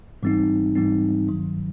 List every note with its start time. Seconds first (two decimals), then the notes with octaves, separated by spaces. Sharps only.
0.23 G#2 E3 G3 C4 D#4
0.75 G#2 E3 G3 C4 D#4
1.28 G2 D#3 F#3